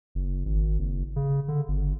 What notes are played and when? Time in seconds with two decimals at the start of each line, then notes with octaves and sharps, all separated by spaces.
0.15 F#1
0.45 G#1
0.79 F#1
1.16 C#3
1.48 D3
1.68 G1